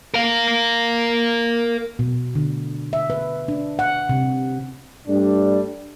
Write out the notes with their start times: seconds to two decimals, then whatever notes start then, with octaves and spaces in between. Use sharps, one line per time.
0.14 A#4 F5
1.99 B2
2.35 D3
2.93 E5
3.10 B4
3.48 D4
3.79 F#5
4.09 C3
5.08 G2 G3 A3 D4